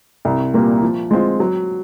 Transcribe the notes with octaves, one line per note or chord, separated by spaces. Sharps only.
C2
A#2 G3 A#3
F3
G#3 C4 F4
F#3